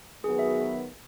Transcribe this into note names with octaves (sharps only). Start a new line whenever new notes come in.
D#3 F#3 B3 F#4 G#4 B4
E5